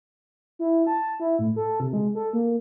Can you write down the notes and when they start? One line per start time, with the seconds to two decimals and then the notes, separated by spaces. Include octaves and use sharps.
0.59 E4
0.87 A5
1.20 E4
1.39 A2
1.56 A4
1.80 C3
1.93 G#3
2.15 A4
2.33 A#3